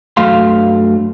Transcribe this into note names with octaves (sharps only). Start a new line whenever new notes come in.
G2 F#3 A3 F5 C6